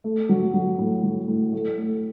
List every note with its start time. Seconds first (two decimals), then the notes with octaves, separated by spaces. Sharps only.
0.04 A3
0.29 F#3
0.54 F#3
0.79 A2
1.03 F#3
1.28 A2
1.53 A3
1.78 A3